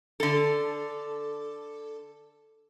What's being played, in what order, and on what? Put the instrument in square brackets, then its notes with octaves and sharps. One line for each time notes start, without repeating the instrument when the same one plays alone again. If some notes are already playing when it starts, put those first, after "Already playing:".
[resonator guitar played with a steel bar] D3 A4